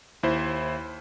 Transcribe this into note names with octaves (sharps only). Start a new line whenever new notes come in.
D#2 E4 C5